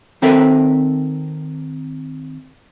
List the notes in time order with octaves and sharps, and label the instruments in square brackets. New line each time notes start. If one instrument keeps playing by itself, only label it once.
[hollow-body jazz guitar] D#3 C4 A4 A#4 E5 B5